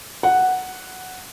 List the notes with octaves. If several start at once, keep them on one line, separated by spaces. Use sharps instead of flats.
F#5